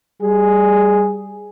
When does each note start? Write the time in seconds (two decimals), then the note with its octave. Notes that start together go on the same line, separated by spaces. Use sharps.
0.22 G3 G#4